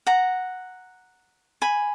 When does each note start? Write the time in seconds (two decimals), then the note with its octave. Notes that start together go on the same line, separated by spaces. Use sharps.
0.07 F#5 A#5
1.62 G#5 B5